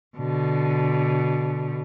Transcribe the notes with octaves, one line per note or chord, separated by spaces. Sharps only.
B2 D3